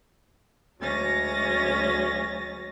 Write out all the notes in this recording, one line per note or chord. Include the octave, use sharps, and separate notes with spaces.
D2 F#3 G#3 C#4 A6 A#6